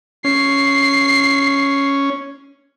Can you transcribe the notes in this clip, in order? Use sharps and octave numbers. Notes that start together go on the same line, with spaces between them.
C#4 C7